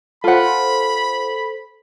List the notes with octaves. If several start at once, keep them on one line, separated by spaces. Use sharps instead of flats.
F4 A4 C5 F#5 B5